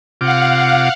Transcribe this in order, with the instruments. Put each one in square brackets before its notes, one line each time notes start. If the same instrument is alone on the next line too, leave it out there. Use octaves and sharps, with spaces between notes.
[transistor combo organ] C3 F4 D6 [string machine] F5 F#5